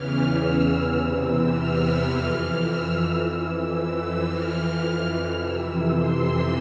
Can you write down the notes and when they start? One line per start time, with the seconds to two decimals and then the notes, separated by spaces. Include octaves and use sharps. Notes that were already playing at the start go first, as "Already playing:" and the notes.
Already playing: E2 C#3 E3 F6
0.42 E6
0.96 E2 C3 E3
1.52 F6
2.08 F2 E3 F6
2.62 E6
3.18 F2 E3 E6
4.29 F2 E3 F6
5.39 F2 C3 E3 E6
5.95 C6